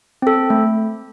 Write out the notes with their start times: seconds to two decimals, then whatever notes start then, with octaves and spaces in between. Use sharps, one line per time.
0.22 C4 A4
0.50 A3